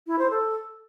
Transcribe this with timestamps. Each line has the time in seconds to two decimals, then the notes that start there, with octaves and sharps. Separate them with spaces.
0.07 E4
0.19 C5
0.30 A4